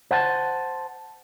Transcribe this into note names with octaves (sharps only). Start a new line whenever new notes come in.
C5 F#5 G#5 A5